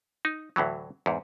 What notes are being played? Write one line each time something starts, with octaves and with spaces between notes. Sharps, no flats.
D#4
D2 A2 E3 F#3
E2 G#2